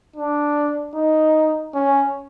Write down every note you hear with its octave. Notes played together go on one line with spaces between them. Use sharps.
D4
D#4
C#4